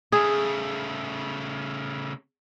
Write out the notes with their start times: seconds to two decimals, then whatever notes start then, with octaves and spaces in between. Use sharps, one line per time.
0.12 C#3 A3 G#4